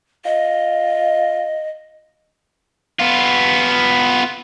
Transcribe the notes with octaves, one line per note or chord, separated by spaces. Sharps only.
F4 D#5
B3 F4